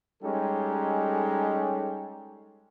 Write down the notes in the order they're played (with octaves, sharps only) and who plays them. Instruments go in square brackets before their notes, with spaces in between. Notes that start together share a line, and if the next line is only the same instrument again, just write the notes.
[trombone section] G3 G#3 C#4 D#4 G4 A4